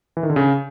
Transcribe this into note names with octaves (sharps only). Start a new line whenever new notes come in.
E3
D#3
D3
C#3